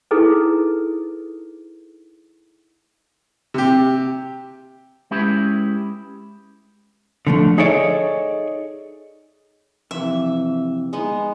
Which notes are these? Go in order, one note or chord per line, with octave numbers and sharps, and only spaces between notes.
D#4 E4 G#4 A4 B4
C3 G4
G#3 C#4 E4 G4 B4
D3 F3 A3
D#4 G#4 A4 C#5 D5 E5
F2 C3 E3 E5
G#3 B3 D#4